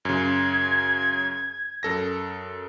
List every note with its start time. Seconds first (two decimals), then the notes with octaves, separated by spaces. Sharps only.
0.05 F#2 C#3 G#6
1.83 F#2 A4 A#6